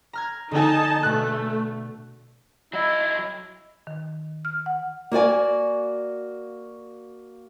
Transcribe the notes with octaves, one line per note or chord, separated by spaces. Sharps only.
A#5 F6 G#6
D3 D#4 D#5 G#5 A5
B2 A3 F#6
F#3 E4 D#5
D#3
F6
F#5
A#3 F#4 D5 G#5